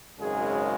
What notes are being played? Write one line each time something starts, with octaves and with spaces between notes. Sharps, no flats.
G#1 F#2 C#3 G#3 G#4